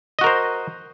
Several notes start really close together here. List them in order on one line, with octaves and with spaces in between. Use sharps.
D#5 F#4 A#4 C5